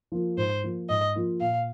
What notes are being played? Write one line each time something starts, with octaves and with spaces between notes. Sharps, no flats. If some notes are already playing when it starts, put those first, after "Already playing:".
F3 A#3 F4
G#2 C5
F3 A#3 F4
G#2 D#5
F3 A#3 F4
A#2 F5